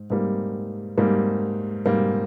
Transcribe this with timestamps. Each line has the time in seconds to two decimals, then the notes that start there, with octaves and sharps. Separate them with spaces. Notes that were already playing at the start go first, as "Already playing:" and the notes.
Already playing: G#2
0.10 G#2 G3 A#3
0.98 G#2 G3 A#3
1.86 G#2 G3 A#3